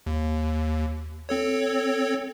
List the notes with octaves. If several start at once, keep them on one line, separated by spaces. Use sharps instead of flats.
D#2
C4 A4 C#5